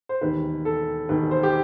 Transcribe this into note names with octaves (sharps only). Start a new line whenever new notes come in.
C5
E1 D#2 D#3 B4
A4
E1 D#2 D#3 B4
C5
G4